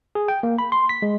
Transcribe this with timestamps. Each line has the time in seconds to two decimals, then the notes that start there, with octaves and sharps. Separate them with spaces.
0.15 G#4
0.28 G5
0.43 A#3
0.59 B5
0.72 C6
0.89 B6
1.02 G#3